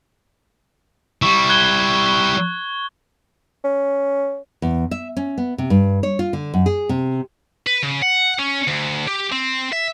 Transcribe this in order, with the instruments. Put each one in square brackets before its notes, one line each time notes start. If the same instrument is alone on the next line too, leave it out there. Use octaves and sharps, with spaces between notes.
[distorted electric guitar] G3 E4 [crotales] C#6
[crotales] F#6 G#6 G7
[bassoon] C#4
[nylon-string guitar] E2
E5
C#4
B3
C3
G2
C#5
F4
D3
F#2
G#4
C3
[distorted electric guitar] B4
C#3
F#5
C#4
D2
G4
C4
E5